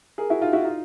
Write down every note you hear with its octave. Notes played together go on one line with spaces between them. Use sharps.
G#4 A#4
E4 F#4
D#4 F4
E4 F#4
D#4 F4